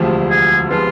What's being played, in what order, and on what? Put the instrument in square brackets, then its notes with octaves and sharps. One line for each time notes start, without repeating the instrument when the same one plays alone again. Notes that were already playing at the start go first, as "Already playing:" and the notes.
Already playing: [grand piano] E1 D2 C3 F3
[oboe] G#4
[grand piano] C3 F3 G#3 B3 [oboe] F4